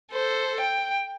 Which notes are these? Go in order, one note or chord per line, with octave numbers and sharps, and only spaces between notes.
A4 C5
G5